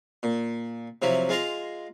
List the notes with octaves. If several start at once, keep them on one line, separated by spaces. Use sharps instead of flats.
A#2
C3 F3 F#3 E4
G#3 F4 A#5 C6